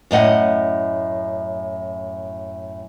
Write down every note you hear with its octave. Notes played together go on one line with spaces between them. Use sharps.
F#2 A2 D#5 F#5